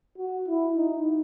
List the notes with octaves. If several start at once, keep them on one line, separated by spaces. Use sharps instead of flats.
F#4
E4
D#4